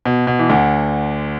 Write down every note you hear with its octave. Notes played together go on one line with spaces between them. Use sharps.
B2
B2
E3
D2 D3